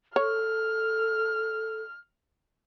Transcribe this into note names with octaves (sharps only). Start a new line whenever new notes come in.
A4 C#5 F6